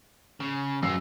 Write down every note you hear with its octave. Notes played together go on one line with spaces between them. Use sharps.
C#3
F#2 G#3 F4 E6 C7